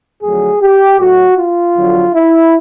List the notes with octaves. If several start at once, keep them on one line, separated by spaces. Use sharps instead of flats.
F2 D3 F#3 A3 G#4
G4
A2 F#3 A3 F#4
F4
F2 D3 F#3
E4